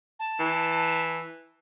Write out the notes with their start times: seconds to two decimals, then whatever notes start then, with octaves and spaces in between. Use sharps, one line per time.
0.20 A5
0.40 E3